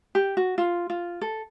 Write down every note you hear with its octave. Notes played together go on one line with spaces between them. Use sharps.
G4
F#4
F4
F4
A4